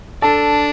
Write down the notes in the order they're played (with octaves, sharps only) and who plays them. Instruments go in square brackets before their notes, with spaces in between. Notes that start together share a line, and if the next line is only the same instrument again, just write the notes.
[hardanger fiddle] D4 [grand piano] A4 A5